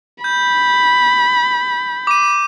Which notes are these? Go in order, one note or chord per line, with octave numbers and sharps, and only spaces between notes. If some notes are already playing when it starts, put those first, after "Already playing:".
B5 G6
D6 D#7